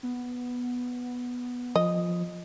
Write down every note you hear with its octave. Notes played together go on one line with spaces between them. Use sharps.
B3
F3 D#5